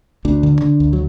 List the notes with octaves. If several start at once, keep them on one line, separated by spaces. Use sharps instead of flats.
D2 D4
D3
D3
D2
F#3